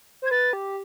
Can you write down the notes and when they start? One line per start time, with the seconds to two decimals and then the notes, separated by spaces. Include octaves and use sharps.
0.22 C5 G#6
0.31 B4 A6
0.53 G4